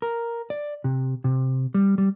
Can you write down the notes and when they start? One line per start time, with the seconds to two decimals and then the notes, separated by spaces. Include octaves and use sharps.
0.02 A#4
0.50 D5
0.84 C3
1.24 C3
1.74 G3
1.98 G3